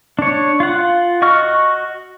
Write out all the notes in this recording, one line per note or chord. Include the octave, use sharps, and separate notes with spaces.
D4 C#5
F4 F#5
F#4 D#5 C#6 F6